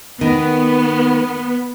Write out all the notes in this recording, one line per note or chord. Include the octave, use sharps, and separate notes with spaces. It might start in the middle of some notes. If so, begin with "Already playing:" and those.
D#3 B3